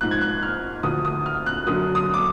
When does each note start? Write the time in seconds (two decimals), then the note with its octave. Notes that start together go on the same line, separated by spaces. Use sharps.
0.01 G#2 F3 F#6
0.11 G#6
0.21 F#6
0.43 F6
0.83 D2 D3 F3 D#6
1.05 D#6
1.26 F6
1.46 F#6
1.66 F#2 D3 F#3 D#6
1.95 D#6
2.14 D6